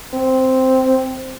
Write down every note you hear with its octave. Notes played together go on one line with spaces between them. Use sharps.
C4